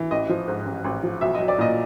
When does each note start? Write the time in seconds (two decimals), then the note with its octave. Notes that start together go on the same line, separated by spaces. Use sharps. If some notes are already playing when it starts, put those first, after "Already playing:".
Already playing: E3
0.11 A1 D#5
0.29 F3
0.48 G#2
0.66 A1
0.84 A1
1.03 F3
1.21 B1 E5
1.35 D#5
1.40 F#3
1.48 D5
1.58 A#2 D#5